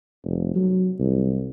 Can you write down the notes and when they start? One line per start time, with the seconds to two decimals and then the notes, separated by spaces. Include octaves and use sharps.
0.25 F1
0.55 F#3
1.00 C2